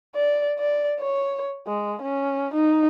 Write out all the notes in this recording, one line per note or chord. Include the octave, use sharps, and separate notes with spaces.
D5
D5
C#5
G#3
C#4
D#4